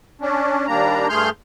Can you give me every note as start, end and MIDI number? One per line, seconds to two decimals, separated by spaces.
0.21 0.67 61
0.21 0.67 62
0.67 1.08 39
0.67 1.08 55
0.67 1.08 58
0.67 1.08 62
0.67 1.08 82
1.09 1.30 43
1.09 1.30 57
1.09 1.30 68
1.09 1.30 84
1.09 1.30 89
1.09 1.30 91